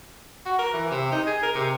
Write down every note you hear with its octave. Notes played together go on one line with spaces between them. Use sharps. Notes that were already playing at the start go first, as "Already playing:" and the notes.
F#4
A#4
E3
C3
D#4
G#4
A#4
C3